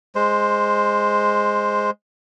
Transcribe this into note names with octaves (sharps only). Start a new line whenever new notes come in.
G#3 C5